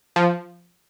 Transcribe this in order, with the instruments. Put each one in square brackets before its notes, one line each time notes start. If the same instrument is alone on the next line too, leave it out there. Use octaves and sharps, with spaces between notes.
[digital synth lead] F3